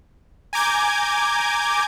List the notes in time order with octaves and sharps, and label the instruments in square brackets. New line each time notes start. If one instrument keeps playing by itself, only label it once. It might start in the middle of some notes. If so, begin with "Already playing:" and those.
[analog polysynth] G#5 A#5 D6 G6 G#6